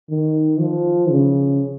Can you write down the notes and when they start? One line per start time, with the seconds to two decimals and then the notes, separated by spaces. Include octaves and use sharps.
0.10 D#3
0.60 F3
1.10 C#3